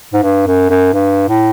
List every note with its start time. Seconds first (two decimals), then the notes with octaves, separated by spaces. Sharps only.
0.13 G#2
0.23 G2
0.47 F#2
0.70 F#2
0.94 G2
1.29 A2